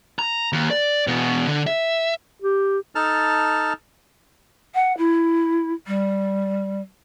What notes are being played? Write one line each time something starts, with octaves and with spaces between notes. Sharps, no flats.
A#5
D#2
D5
E2 B2
D3
E5
G4
D#4 A4 A5 F6
F#5
E4
G3